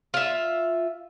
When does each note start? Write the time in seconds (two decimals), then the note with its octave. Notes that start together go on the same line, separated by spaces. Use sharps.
0.14 F4 E5